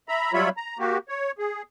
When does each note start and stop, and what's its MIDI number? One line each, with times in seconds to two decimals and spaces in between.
0.08 0.32 76
0.08 0.32 82
0.08 0.32 83
0.33 0.49 54
0.33 0.49 55
0.33 0.49 65
0.33 0.49 73
0.33 0.49 76
0.33 0.49 83
0.57 0.78 82
0.79 0.98 58
0.79 0.98 66
0.79 0.98 67
1.09 1.32 73
1.38 1.62 68